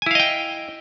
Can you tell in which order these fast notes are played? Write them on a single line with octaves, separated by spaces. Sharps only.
G#5 E4 F5 D#5 G5